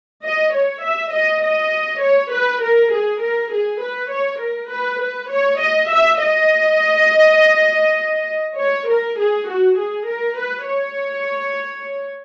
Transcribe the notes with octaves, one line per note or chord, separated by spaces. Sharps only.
D#5
C#5
E5
D#5
D#5
C#5
B4
A#4
G#4
A#4
G#4
B4
C#5
A#4
B4
B4
C#5
D#5
E5
D#5
C#5
A#4
G#4
F#4
G#4
A#4
B4
C#5